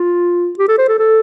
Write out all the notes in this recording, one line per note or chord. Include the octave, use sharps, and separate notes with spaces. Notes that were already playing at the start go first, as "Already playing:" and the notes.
Already playing: F4
G4
A4
C5
A4
A4